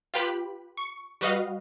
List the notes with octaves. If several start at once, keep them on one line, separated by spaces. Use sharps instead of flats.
F4 G4 B4 B5
C#6
G3 F#4 B4 D#5 F5